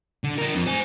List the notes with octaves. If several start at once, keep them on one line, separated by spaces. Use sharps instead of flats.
D3
D4 A#4
F2
C5 G#5